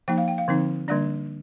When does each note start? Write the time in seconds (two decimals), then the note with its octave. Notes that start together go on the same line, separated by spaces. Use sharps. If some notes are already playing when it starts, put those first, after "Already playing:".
0.08 F3 A#3 D#4 G5
0.18 F5
0.28 G5
0.38 F5
0.48 D3 F3 C4 D#4
0.88 D3 G3 A#3 D4 D5